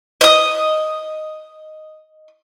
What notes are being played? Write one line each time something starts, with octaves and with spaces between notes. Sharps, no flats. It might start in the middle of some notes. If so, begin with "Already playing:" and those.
D#5 D#6